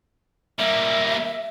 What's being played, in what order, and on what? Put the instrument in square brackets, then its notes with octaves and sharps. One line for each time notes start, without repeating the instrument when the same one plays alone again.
[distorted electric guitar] G3 A#3 [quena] E5